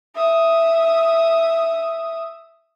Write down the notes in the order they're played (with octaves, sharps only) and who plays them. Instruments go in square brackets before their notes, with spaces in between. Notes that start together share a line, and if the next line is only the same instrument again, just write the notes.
[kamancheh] E5 D#6